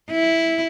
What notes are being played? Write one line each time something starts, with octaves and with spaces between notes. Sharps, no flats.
E4